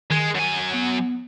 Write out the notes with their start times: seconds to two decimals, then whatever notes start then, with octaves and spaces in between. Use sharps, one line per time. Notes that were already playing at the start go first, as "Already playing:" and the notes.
0.11 D#3 G#3
0.35 F#2 G#5
0.74 B3